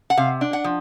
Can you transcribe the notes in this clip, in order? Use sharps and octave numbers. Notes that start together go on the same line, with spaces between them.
F#5
C3 F5
D4
F#5
F3